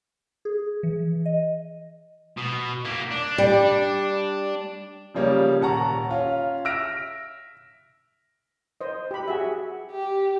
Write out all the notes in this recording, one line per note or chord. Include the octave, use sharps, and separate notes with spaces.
G#4
E3
D#5
B2
A#3 E4
D4
G3
C#3 F3 G3 A#3 C#4
D#1 F#5 A5 A#5 C#6
C#4 F4
E5 E6 F6 A#6 D7
C5 D#5
G4 B5
F#4 G#4 E5
G4